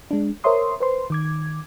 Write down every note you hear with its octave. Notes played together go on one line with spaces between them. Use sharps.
G#3 D4
A#4 C5 C#5 E5 C6 D#6
B4 C5 C6
D#3 D6 G#6